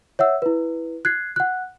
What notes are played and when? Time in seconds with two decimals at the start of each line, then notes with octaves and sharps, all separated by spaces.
0.19 C#5 E5 F#5 E6
0.42 E4 B4
1.05 F#6 G#6 C7
1.36 F#5 F#6